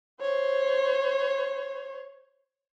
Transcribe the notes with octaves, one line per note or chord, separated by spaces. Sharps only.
C5 C#5